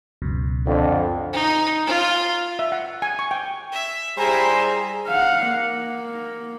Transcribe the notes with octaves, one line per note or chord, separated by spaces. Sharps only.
C#2 F#2 B2
F2 D3
D#4
F4
E5
F#5
G#5
C#6
G5
E5
G3 E4 G#4 C5 E5 G#5 A#5
F5 F#5
A#3